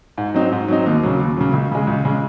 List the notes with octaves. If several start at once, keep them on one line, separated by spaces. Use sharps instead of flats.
G#2
F#3 C4 D#4
G#2
F#3 C4 D#4
D#2
C#3 F#3
D#2
C#3 F#3
C#2
C#3 G#3
C#2
C#3 G#3